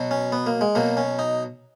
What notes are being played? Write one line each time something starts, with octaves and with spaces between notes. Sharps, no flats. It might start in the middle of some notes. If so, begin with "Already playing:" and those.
Already playing: B2 F#3
C#4
B3
A#3
G#3
B2 F#3 A#3
C#4
D#4